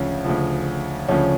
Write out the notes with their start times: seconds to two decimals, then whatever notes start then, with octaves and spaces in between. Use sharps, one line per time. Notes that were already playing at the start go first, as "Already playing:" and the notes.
Already playing: D2 C#3 F3 C#4
0.25 D2 C#3 F3
1.09 D2 C#3 F3 C#4